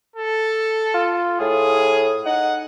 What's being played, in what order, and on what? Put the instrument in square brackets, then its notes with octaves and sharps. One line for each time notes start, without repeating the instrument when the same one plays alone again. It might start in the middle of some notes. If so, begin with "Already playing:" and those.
[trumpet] A4
[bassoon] F4
[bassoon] A2 [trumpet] G#4
[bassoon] D#4 [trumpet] F#5